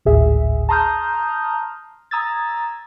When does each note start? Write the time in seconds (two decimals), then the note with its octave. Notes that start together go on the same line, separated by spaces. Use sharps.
0.05 G#1 D2 A2 G#4 E5
0.69 A5 A#5 C6 D#6 F6 G6
2.11 A#5 D#6 E6 G#6 A6